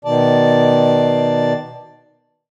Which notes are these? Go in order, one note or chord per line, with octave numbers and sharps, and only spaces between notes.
B2 D#3 D5 A5